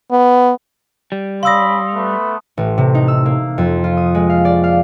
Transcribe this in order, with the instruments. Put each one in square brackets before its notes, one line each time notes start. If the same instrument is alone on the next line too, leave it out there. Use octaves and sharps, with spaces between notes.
[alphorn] B3
[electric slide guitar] G3
[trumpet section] C#4 D5 B5 [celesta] F5 E6 A#6 [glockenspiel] C6 D#6
[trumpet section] A3 B3 B4
[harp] A1
C3
D#4
E6
A#3
F2
F4
D#6
G#3
F5
D5
F5